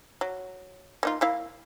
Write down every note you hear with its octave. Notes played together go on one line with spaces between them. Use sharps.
F#3
A#3 D#4 F4
A#3 E4 F5